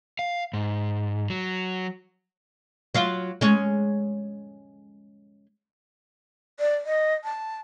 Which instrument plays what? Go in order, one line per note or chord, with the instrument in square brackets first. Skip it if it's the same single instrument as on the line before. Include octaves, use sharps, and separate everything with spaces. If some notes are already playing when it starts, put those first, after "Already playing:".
[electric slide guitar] F5
G#2
F#3
[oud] F#3 F4
G#3 C#4
[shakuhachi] D5
D#5
A5